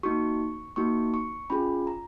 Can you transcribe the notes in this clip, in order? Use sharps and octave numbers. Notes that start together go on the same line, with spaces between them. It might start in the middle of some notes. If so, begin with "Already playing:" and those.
A#3 D#4 F#4 C#6
A#3 D#4 F#4 C#6
C#6
C#4 F4 G#4 B5
A#5